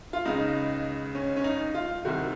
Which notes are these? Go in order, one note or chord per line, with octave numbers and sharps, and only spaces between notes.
F4
C#2 C#3 D#4
C#4
C#4
D#4
F4
C2 C3 D#3 F#4